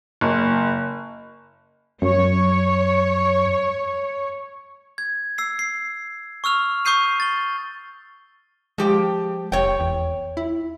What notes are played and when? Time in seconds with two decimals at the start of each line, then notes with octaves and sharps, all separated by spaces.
0.21 F#1
2.02 F#2 C#5
4.98 G#6
5.38 E6 C7
5.59 C7
6.44 C#6 E6 F6 F7
6.85 C#6 D#6 G6 C7 D#7
7.20 A6 G7
8.78 F3 G#3 G4 G5
9.52 F1 C#5 G5
9.80 E2
10.37 E4